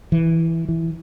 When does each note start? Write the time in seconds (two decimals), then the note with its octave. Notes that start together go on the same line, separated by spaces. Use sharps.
0.12 E3
0.69 E3